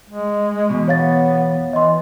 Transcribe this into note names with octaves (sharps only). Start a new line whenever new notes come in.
G#3
E2 G2 B2
B3 C#5 F5 A6
E3 D#5 C6